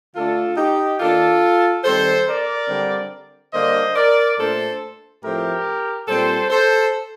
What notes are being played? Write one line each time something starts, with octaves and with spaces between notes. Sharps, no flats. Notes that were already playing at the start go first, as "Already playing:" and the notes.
D3 A3 D4 F4 A4
D#4 G4
D#3 A#3 D4 F4 A4
D#3 G3 C4 A4 C5
A#4 D5
D3 G3 C4
D3 G3 A#3 D4 C5 D#5
A#4 D5
A#2 A3 D4 A4 C5
A2 F3 A3 C4 G4 A#4
A#2 G3 C4 A4 C5
A4 C5